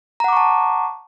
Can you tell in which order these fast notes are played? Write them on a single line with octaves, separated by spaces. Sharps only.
A#5 F#5 D6 C#6 A5